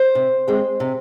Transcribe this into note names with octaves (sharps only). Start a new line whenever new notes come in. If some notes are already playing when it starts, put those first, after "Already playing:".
Already playing: C5
C3
G#3 C4
C3